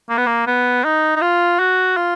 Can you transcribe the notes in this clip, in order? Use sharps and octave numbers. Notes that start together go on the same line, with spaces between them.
A#3
B3
A#3
B3
D#4
D#4
F4
F#4
F4